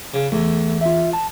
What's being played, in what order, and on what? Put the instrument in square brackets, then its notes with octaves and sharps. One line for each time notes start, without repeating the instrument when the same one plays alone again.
[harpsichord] C#3
[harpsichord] E2 [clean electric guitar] A3
[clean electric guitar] F4 E5
A5